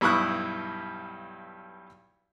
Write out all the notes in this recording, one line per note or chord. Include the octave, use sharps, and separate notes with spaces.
B1 G2 E4 C#6 D#6 F#6